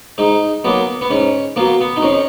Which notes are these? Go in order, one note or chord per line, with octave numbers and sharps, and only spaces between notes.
G#2 D#4
F#3 A#3 B3
B3
G#2 C#4
F#3 A#3 B3
B3
D#4
F2 C#4